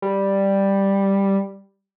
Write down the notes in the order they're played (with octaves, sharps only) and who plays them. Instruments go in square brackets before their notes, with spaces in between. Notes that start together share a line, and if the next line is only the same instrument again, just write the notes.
[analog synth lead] G3